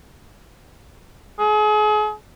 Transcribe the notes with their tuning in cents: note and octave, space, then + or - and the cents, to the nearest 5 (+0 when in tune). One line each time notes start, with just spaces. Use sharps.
G#4 +35